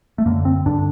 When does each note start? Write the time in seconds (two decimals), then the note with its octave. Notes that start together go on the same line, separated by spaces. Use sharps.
0.18 A3
0.26 F#2 D3 A#3
0.45 C4
0.66 G2 D3 D4